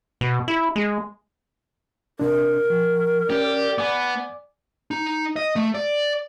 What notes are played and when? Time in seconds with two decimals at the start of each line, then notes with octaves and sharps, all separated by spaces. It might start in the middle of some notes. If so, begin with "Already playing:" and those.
0.21 B2
0.48 E4
0.76 G#3
2.19 C3 D4 A#4
2.70 F3
3.30 C#4 G4 D5
3.78 B3 G#5 D6
4.91 D#4
5.36 D#5
5.56 A3
5.75 D5